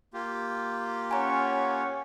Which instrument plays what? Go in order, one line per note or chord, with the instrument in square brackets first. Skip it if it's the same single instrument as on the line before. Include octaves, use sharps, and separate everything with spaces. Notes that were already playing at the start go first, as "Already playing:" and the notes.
[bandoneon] A#3 F4 G4
[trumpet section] C#4 C#5 F#5 [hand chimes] G#5 A#5